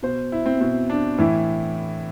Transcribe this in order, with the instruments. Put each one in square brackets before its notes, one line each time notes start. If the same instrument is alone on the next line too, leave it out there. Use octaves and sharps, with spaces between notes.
[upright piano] B2 C5
E4
C4
B2 C4
D4
A2 E3 E4